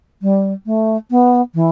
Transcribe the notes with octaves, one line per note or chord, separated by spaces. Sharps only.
G3
A3
B3
E3